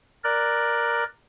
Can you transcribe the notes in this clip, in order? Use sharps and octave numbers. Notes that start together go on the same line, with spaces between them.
A#4 D5 F#6